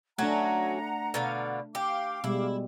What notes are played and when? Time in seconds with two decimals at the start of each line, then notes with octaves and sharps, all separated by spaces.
0.18 F#3 A3 C#4 D4 F#4 F#5 A#5
1.14 B2 D3 F5
1.75 G4 F5 D6
2.24 B2 G3 G#3 E4